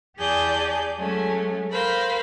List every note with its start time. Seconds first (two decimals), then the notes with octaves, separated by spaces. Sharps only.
0.19 E2 G4 G#4 D5 A5 G6
0.98 F#3 G#3 A3 C#4
1.71 A#4 C5 F5 B5